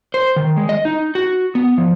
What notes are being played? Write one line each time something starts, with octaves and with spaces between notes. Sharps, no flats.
C5
D#3
G#3
D#5
D#4
F#4
B3
F3